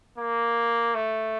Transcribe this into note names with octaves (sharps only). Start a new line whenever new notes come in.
A#3
A3